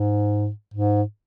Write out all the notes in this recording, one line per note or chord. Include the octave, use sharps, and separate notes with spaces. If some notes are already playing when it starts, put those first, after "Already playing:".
Already playing: G#2
G#2